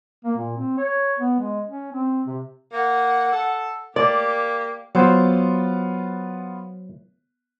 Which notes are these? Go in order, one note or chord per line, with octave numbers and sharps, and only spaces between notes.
A#3
A#2
C4
C#5
B3
G#3
C#4
C4
C3
A#3 F#5
A4
A#3 G4 D5
F#3 B3 F4 C5